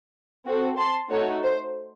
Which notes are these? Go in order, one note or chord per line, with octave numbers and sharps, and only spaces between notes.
C4 F#4 A4
A5 C6
A3 D#4 F#4 A4 C#5
C5